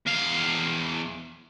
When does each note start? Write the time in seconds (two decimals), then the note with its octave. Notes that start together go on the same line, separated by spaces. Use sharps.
0.06 E2 F5